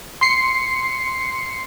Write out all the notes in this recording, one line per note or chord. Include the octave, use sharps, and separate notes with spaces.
C6 C7 C#7